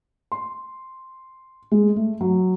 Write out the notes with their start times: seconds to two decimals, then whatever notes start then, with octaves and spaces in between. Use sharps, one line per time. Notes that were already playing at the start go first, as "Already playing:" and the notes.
0.32 C6
1.71 G#3
1.96 A3
2.21 F#3